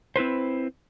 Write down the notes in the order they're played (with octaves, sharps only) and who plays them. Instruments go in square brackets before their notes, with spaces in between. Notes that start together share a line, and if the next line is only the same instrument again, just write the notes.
[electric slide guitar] C4 E4 B4 C5